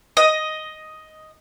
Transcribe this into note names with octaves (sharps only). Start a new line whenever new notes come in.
D#5